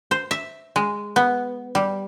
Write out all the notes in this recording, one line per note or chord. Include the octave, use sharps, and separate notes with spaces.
C5
E5
G#3
B3
G3